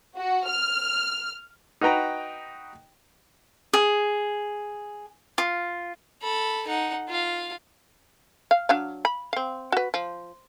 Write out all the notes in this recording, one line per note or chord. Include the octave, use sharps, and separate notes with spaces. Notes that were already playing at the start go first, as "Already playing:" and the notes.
F#4
F6
D#4 F#4 B4 G5 A#5
G#4
F4
A4 B5
D#4 F#5
F4 F5
F5
F#3 D4 F5
B5
C4 F5
F#4 B4
F3